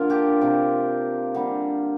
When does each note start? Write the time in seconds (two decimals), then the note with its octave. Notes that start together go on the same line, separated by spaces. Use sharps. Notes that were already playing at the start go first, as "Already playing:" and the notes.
Already playing: D3 A#3 F4 A#4
0.10 D4 G4
0.41 C3 A#3
1.34 D3 G3 A#3